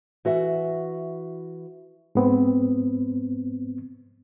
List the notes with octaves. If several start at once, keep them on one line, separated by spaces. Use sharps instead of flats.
E3 F#4 E5
G#2 B3 C4